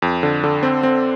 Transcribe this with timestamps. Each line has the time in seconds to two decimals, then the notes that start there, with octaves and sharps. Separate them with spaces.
0.02 F2
0.23 D3
0.44 D3
0.63 C4
0.83 C4